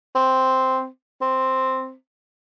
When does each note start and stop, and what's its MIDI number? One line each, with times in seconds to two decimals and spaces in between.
0.15 0.87 60
1.21 1.94 60